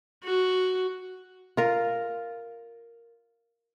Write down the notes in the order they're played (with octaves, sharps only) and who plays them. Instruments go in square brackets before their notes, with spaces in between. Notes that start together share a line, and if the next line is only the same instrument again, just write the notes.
[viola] F#4
[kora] F4 A#4